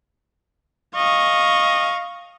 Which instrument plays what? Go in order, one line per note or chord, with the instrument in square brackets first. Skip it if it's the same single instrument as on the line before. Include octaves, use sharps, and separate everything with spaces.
[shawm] D#5 [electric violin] F5 C#6